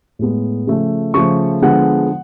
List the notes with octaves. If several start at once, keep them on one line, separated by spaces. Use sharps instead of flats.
A2 G#3 B3
C#3 F3 A3
C#3 F3 A3 C#6
D3 F3 G#3 B3 F#5